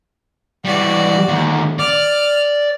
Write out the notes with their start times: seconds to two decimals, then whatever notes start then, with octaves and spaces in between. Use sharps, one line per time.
0.65 E3 G3 F#4 D5
1.28 D#2 D3
1.79 D5 F6